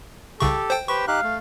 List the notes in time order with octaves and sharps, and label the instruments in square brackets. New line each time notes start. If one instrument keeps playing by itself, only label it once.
[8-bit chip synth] C2 C#3 C#6 [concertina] G4 [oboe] A4
[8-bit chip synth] C5 G5
[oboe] G4 [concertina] B4 C5 [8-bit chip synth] C#6
[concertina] D#4 G4 F#6 [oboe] F5
[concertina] A3